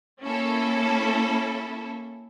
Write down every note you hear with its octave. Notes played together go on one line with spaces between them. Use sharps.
A#3 C#4 E4 A4